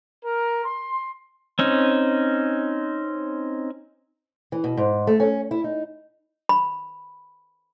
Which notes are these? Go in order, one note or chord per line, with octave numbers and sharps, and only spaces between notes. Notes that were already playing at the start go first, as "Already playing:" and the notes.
A#4
C6
C4 C#4 D#4
E3
B2
G#2
A3
C#4
E4
D#4
B5